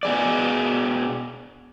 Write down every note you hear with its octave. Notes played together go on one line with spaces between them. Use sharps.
B2 G#4 D5